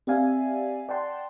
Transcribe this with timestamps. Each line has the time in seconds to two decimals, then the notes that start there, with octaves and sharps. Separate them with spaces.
0.07 C4 G4 D5 E5 F5 G#5
0.89 D5 F#5 G5 A5 C6